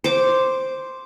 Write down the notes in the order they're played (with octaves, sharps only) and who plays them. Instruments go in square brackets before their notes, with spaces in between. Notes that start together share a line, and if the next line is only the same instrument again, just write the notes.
[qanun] C5 D6